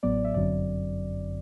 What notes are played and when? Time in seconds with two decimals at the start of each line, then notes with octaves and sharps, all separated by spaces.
0.03 A1 A2 F#3 B3 D5
0.24 E5
0.34 G1 F#2 D3 F#3 C4 D5